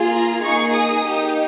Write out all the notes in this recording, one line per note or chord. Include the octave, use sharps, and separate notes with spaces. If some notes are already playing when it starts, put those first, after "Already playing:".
Already playing: A#3 F4 G#4
A#5
A#3 D#4 G#4 C#6
D#6
A#3 D#4 G4